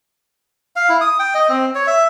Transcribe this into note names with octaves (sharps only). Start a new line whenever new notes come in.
F5
E4
D#6
G5
D#5
C4
C#5
E5